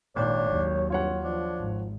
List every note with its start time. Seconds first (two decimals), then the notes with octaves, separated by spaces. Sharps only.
0.16 G#1 A#2 D4 C#5
0.51 D#2 F#3
0.90 G2 C3 F4 C#5 F#5
1.24 F3 D4
1.59 G#1